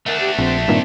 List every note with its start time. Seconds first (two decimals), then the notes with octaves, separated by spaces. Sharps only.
0.06 A3 D4 A#4 E5 F#5
0.20 G4
0.38 A#1 C4
0.68 G2 A#2 D#3 C4